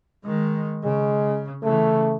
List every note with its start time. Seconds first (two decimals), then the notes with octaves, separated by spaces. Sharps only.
0.25 D#3 G#3
0.84 C#3 G#3
1.63 C#3 E3 A3